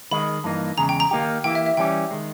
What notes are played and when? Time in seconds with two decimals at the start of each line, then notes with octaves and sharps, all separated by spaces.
0.11 D#3 G#3 D#4 B5
0.44 G2 E3 A#3 D#4
0.78 E2 C#3 G#3 A#5
0.89 G5
1.00 A#5
1.11 D#3 A#3 D#4 G4
1.44 E3 A#3 E4 G4 G5
1.55 E5
1.66 E5
1.77 E3 G3 C#4 G4 G5
2.11 D#3 G#3